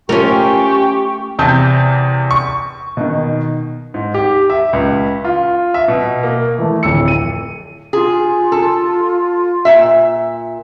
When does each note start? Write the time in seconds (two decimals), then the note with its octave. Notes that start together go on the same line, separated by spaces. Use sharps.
0.09 A3 C#4 F4 G4 A#4 G5 C#6
1.39 E2 C3 A5 G6
2.31 C#6
2.97 B2 D#3
3.94 G#2
4.14 G4
4.50 E5
4.73 C#2
5.25 F4
5.74 E5
5.88 B2
6.23 A#3
6.58 E3 A3
6.83 D1 F2 E6 C#7
7.08 D#7
7.93 F4 G#4
8.52 A4
9.65 A#2 E5